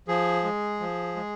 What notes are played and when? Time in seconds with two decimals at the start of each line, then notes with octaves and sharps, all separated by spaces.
0.08 F3 G#4
0.44 G#3
0.80 F3
1.16 G#3